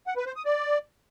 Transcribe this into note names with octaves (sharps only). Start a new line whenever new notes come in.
F#5
B4
C5
D#6
D5